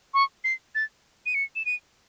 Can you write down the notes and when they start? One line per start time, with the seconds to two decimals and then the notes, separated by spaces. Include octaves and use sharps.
0.14 C#6
0.44 C7
0.75 A6
1.26 D#7
1.34 C#7
1.56 E7
1.66 D#7